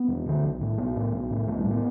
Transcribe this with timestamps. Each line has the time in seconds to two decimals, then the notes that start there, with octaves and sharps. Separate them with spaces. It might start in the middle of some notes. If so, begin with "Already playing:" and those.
Already playing: B3
0.08 E1
0.26 D2 D3
0.44 B1
0.61 A2
0.78 B1 B3
0.96 A2
1.12 B1
1.30 A2
1.47 B1 A3
1.58 G3
1.64 A2
1.71 B3